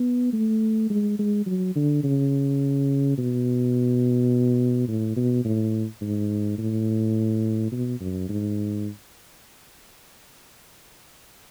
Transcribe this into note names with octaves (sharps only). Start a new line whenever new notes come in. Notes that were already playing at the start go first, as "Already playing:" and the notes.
Already playing: B3
A3
G#3
G#3
F#3
D3
C#3
B2
A2
B2
A2
G#2
A2
B2
F#2
G#2